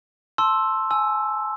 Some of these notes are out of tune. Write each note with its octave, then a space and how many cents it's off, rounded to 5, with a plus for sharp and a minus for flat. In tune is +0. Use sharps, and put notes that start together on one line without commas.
A5 +0 C6 +10 E6 +0
G#5 +25 E6 +0